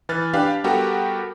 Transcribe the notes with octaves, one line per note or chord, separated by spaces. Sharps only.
E3 B4 F6 A6
D4 G4 B4 F5
G3 B3 F#4 G4 A4 A#4